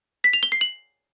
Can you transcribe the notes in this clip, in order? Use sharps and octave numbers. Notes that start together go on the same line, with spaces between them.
B6
F7
G7
C7
F#7